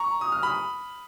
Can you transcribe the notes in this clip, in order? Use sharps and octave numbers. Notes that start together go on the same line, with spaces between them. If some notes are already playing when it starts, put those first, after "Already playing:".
Already playing: A#5 C#6
D#6
F6
B5 D#6